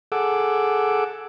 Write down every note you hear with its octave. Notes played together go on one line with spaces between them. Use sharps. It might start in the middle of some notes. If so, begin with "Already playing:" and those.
G#4 A4 F#5 D6 E6